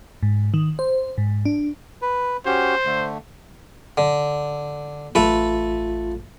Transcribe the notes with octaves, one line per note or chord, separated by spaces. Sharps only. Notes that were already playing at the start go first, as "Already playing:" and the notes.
G#2
D#3
C5
G#2
D4
B4
C#4 F#4 G4 C5
D3 A3
D3
A1 A3 F4 A4 B4